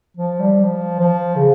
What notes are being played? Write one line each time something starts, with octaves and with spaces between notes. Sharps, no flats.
F3
G3
F3
F3
C#3